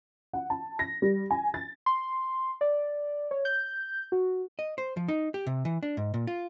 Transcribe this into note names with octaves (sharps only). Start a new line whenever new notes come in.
F#5
A5
A#6
G3
G#5
A6
C6
D5
C#5
G6
F#4
D#5
C5
F3
D#4
G4
C3
E3
D4
G#2
A#2
F4